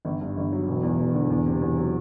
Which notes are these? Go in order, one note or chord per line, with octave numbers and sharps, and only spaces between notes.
G1
G2
G1
F#3
E1
E2
E1
D3
E2
C3
E2
F#3